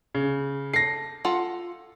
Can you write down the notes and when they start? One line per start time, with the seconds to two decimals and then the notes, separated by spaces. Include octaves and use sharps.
0.15 C#3
0.74 A4 A#6 C7
1.25 F4 A4 F#5